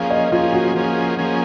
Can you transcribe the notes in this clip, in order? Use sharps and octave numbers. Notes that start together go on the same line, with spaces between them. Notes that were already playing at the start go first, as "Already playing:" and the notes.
Already playing: F3 A#3 C#4 G#4 F5
D#5
F3 A#3 C#4 F4 G#4
F#4
F3 A#3 C#4 G#4
F3 A#3 C#4 G#4